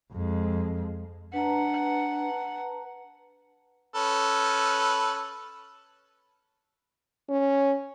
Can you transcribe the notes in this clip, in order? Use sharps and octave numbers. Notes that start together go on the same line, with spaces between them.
F2 G#3
D4 B4 F#5 A5 A#5
C#4 A4 B4
C#4